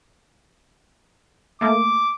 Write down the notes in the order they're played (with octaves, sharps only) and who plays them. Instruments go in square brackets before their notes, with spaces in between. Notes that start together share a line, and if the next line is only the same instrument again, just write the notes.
[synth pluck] A3 A#3 [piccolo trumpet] D6